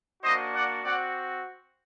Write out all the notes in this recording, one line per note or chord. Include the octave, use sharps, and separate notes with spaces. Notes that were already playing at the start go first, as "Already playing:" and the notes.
A#3 D4 F#4 C5 D#5
D5 F#5
C4 F#4 D5 F#5